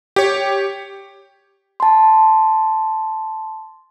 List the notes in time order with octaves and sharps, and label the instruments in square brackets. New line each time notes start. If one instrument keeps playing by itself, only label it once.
[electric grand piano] G4 C#5
[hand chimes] A5 C6